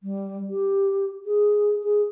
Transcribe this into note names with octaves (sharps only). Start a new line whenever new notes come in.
G3
G4
G#4
G#4